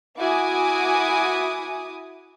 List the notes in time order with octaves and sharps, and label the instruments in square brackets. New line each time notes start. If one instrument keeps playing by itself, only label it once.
[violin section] E4 F#4 G#5 D6 D#6